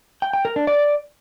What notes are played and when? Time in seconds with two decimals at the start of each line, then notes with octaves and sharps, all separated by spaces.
0.22 G5
0.33 G5
0.45 A#4
0.56 D4
0.67 D5